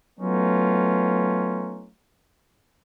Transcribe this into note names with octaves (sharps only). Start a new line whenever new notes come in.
F#3 A3 B3 C#4 D#4 F4